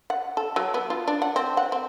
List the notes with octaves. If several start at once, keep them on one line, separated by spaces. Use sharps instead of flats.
F#5
A4
F#3
B3
F4
D4
F#5
C4
F#5
C4